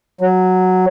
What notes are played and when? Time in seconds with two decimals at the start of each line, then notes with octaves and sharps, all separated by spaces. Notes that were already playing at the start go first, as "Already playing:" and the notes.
0.21 F#3